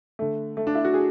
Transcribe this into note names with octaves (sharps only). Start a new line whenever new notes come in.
D3 A3
A3
D4
E4
F#4
G#4